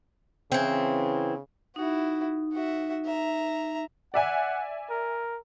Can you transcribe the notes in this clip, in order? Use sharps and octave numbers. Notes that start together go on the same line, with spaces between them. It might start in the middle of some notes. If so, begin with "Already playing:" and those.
C#3 E3 C4
D#4 E4 F#4
F#4 E5
E5 A#5
D5 E5 F#5 G#5
A#4